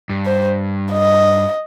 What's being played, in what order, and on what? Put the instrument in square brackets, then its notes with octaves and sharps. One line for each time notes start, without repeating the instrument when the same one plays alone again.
[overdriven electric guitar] G2
[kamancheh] C5
D#5